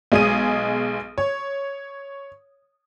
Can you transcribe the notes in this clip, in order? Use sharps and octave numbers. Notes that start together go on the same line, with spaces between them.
B1 G#3 G#4 D#6 D#7
C#5